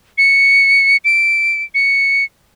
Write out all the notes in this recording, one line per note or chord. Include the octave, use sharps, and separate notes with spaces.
C#7
D7
C#7